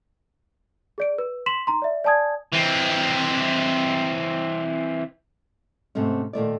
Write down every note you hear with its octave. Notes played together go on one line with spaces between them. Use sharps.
G#4 D5 D7
B4
C6 B6 E7 F#7
D#4 A#5 C6
D5 E5
D5 G#5 A5 D#6 G#6
E3 C4
G#2 C3 A3 C#4
A#2 D#3 A3 D5